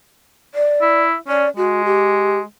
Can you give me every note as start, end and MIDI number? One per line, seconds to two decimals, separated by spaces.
0.54 1.02 74
0.82 1.15 64
1.28 1.45 61
1.28 1.49 74
1.57 2.43 56
1.57 1.83 66
1.85 2.38 67